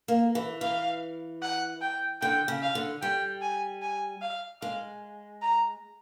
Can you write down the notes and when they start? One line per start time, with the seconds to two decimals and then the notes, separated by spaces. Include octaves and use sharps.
0.08 A#3
0.35 E3
0.61 E3 F5
1.42 F#5
1.82 G5
2.22 D3 G5
2.48 C#3
2.62 F5
2.75 D3
3.02 G3 G5
3.42 G#5
3.82 G#5
4.21 F5
4.61 G#3 F5
5.42 A#5